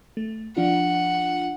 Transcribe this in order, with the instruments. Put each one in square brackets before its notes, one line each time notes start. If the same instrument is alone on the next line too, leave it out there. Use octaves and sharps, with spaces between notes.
[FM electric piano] A3
[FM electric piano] F3 D4 F4 [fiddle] F#5